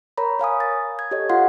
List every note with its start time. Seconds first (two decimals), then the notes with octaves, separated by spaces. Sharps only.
0.18 A#4 C#5 A#5 B5
0.39 C#5 F5 G#5 D#6
0.60 A6
0.99 G#6
1.11 G4 A4 C#5 D#5
1.29 F4 F5 F#5 C6